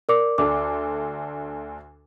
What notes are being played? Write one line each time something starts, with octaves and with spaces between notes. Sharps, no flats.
A#4 D5 D6
D2 D4 A4 D6